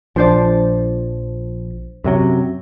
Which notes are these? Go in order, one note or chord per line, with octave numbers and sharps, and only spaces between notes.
A#1 F3 D4 C5 D5
F#2 C3 F#3